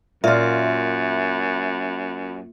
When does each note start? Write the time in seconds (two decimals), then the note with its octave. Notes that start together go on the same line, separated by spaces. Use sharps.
0.24 F#2 A#2 F4 E5